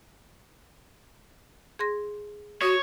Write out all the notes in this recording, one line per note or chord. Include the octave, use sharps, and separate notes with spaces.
G#4 C6 A#6
F#4 C#5 D#6